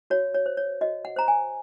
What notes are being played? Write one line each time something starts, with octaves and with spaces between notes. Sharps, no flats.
F#4 C#5
C#5
C5
C#5
F#4 D#5
F#5
C5 A#5
G#5